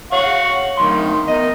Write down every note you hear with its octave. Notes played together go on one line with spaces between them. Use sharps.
C#5 F5 F#5 C#6
D2 D#3 F#3 C6
E2 A#4 D#5